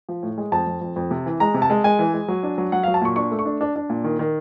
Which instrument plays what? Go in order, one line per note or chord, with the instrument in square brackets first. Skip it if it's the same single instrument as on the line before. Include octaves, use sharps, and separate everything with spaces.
[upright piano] F3
A2
G#3
F2 A5
F2
F2
F2
C3
E3
G#3 A#5
C3
A5
G#3
G#3 G#5
E3
G#3
F#3
D4
F#3
F#3 F#5
F#3 F5
A5
A#2 C#6
D4 C#6
A3
C#6
D4
D4
D4
A#2
D#3
D#3